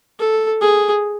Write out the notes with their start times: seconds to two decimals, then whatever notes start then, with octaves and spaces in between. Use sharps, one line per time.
0.19 A4
0.61 G#4